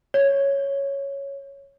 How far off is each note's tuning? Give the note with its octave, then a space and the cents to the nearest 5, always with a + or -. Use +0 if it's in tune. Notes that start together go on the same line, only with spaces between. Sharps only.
C#5 +0